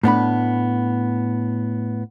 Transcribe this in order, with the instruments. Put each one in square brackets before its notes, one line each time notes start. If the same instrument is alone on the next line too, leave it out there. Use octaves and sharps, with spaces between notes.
[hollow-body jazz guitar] A2 B3 D4 B5